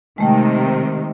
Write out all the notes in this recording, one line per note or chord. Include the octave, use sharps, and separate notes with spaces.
C3 D#3 G#3 A3 G5